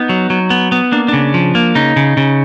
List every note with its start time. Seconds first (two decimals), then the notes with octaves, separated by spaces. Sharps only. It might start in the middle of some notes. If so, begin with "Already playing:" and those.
Already playing: B3 D#4
0.09 F#3
0.30 F#3
0.50 B3
0.72 B3
0.92 A#3 D4
1.08 C#3 D4
1.34 F3
1.55 A#3
1.75 C#3 D#4
1.96 C#3
2.17 C#3